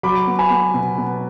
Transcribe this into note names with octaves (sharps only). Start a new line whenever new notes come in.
F#3 B5 D6
B3
G#5 B5
B3
B2
B3